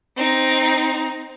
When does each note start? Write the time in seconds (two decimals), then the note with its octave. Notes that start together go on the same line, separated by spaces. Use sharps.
0.16 C4 D#4